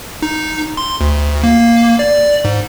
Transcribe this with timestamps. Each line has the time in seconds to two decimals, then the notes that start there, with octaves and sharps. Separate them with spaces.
0.22 D#4
0.77 C6
1.01 D2
1.43 A#3
1.99 D5
2.45 G#2